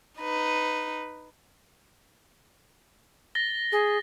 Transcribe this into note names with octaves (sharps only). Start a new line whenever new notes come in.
D#4 B4
A6 A#6 G7
G#4